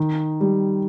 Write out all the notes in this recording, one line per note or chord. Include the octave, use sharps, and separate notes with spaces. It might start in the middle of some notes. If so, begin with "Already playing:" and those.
Already playing: D#3
G3